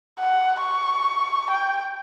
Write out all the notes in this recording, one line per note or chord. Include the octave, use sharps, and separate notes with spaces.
F#5
C#6
G5